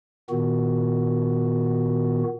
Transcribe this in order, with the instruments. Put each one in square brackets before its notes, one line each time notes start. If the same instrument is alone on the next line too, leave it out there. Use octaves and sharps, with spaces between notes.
[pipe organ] A#2 D#3 B3 F#4